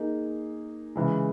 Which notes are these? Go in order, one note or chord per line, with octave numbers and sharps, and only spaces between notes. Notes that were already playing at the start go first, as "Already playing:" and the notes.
Already playing: A#3 D#4 G#4
C#3 E3 G#3